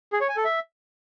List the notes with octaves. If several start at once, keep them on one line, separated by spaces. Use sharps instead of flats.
G#4
C#5
G#5
A4
E5